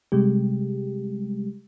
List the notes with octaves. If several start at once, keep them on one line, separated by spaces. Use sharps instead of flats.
C3 G3 G#3 G4